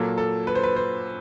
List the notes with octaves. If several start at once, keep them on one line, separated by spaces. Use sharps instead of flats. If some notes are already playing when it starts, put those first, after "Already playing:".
Already playing: A#2 F#3 A#3 A4
A4
B4
C5
B4
C5